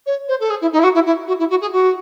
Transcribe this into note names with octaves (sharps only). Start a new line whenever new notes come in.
C#5
C5
A4
G#4
E4
D#4
E4
F#4
E4
E4
F#4
E4
F#4
G#4
F#4